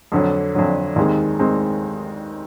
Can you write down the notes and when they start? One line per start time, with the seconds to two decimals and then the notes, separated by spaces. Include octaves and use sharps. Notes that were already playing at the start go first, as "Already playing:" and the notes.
0.12 F2 D3 F#3
0.55 F2 D3 F#3
0.96 D#2 D#3 G#3 C4
1.39 D#3 G#3 C4